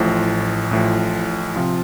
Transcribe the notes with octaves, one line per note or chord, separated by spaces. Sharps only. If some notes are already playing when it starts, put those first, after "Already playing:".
Already playing: A1 A2 F3
A1 A2 F3
C3 F3 C4 F4